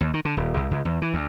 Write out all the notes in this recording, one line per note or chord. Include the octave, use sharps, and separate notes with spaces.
D#2
D#3
D3
D#1
C2
C#2
E2
E3
D2